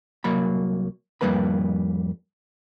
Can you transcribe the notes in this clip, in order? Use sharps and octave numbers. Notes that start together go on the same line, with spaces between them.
C2 F#3 A#3 B5
F2 G#2 G3 A#3 B4 B5